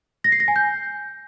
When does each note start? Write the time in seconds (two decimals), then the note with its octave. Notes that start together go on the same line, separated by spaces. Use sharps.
0.24 A#6
0.32 C7
0.40 A#6
0.48 G#5
0.56 G6